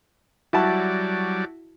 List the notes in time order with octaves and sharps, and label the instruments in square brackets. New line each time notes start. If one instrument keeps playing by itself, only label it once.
[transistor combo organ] F#3 G3 D5 [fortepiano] E4 F#4 A5